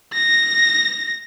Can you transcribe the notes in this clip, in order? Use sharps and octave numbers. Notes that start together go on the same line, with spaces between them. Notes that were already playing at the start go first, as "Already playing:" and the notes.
A#6